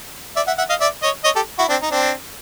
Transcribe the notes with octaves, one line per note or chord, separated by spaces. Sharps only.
D5 E5
E5 F#5
E5 F#5
D#5 F5
D5 E5
C#5 D#5
C#5 D#5
G4 A4
E4 F#4
C4 D4
D#4
C4 D4